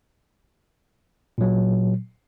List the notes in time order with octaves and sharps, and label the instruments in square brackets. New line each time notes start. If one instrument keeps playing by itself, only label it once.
[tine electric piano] A#2 F#3